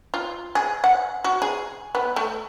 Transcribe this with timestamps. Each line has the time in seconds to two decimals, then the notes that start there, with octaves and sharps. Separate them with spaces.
0.14 F4
0.55 G#4
0.84 F#5
1.24 F#4
1.42 G#4
1.95 B3
2.16 A3